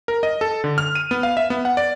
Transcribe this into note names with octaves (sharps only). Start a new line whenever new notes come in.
A#4
D#5
A4
D3
F6
D#7
B3
F5
E5
B3
F#5
D5